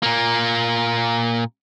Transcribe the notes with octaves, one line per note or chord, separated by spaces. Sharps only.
A#2 A#3